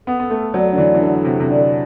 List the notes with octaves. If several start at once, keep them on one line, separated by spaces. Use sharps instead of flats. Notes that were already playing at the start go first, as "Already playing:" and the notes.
B3 A4
B3
A3
F#3 D5
D3
E3
E3
D3 A4
C3
C3
D3 D5